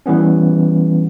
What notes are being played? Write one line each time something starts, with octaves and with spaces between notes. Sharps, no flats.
E3 G3 B3 C#4